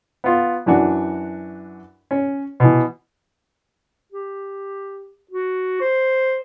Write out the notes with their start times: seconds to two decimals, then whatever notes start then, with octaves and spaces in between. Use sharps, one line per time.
0.24 B3 F4
0.66 F#2 E3 D4 F#4
2.11 C#4
2.60 B2 E3
4.12 G4
5.31 F#4
5.81 C5